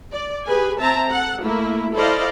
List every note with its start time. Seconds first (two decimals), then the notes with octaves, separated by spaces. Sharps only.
0.12 D5
0.45 G4 G#4 B4 G#5
0.80 C4 E5 A5 A#5
1.10 A4 F#5
1.40 A3 A#3 E4
1.94 E4 A4 C5 D5 D#5 F5